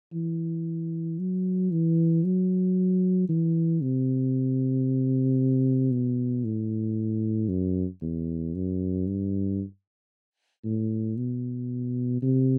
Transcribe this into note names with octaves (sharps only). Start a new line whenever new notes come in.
E3
F#3
E3
F#3
E3
C3
B2
A2
F#2
E2
F#2
G2
A2
B2
C3